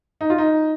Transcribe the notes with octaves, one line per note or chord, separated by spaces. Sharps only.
D#4
F4
D#4